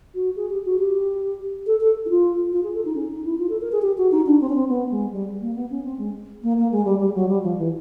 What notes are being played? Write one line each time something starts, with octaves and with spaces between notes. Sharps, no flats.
F#4
G#4
G4
F#4
G4
A4
A4
E4
F4
F4
G#4
A4
D#4
C#4
D#4
E4
F4
A4
A#4
G#4
G4
F#4
D#4
D4
C4
C#4
C4
B3
G#3
G3
A#3
B3
C#4
C4
G#3
A#3
A#3
G#3
G3
G3
F#3
G3
F3
E3